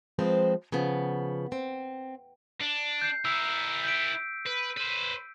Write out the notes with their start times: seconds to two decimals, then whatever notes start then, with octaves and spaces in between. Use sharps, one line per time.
0.19 F3 G#3 C4 B4 C5
0.72 C#3 F3 B3
1.52 C4
2.61 D4
3.02 G6 C7
3.25 E4 A#4 E6
3.84 G6 B6 D7
4.46 B4
4.77 B4 C5